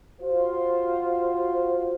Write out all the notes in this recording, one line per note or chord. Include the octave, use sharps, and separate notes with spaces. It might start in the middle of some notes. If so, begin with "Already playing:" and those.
F4 F#4 C5